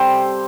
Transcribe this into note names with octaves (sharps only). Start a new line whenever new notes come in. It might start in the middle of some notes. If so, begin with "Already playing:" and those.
Already playing: C3 G3 A4 C5